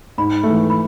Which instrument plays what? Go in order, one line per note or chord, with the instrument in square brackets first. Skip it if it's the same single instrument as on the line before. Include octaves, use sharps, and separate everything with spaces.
[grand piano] G#2 [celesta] B5
[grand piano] A3
E3
[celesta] B5